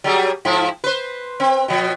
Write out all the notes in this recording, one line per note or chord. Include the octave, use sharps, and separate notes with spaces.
F#3 G3 G#4
G#2 F3 E4
B4 C5
C4
B2 F3